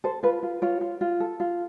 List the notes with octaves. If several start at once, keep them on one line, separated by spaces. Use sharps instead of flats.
A4 C5
F4 B4
F4
F4 C#5
F4
F4
A4
F4